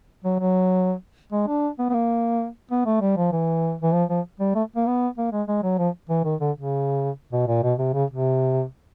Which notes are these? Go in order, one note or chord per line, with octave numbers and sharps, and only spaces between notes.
F#3
F#3
G#3
D4
B3
B3
A#3
B3
A3
G3
F3
E3
E3
F3
F3
G3
A3
A#3
B3
A#3
G#3
G#3
F#3
F3
E3
D#3
D3
C#3
B2
A#2
B2
C3
C#3
C3